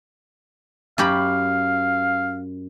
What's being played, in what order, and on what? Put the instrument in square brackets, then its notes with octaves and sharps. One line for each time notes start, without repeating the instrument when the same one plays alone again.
[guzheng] F#2 G4 B5 [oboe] F5